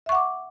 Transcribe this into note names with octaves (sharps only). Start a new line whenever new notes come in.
E5 F#5 C#6 D6